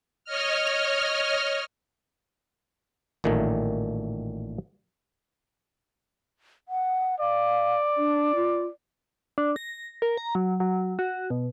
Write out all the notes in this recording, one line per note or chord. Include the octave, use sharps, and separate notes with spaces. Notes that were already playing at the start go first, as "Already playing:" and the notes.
C#5 D#5 F6
A1 A#2 D#3 F#3 A3
F#5
D5 F5
D4
F4
D4
A#6
A#4
A#5
F#3
F#3
F#4
B2